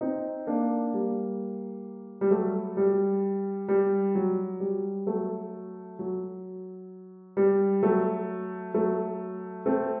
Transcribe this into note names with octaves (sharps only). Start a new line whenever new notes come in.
C4 D#4
A#3 D4
G3 A#3
G3
F#3 A3
G3
G3
F#3
G3
F#3 A3
F#3
G3
F#3 A3
F#3 A3
A3 C4